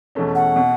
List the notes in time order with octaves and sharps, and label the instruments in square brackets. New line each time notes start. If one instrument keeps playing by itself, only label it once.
[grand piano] E2 B2 A3 C#4
[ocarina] F#5
[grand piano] B2